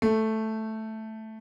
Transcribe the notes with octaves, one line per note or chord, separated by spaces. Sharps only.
A3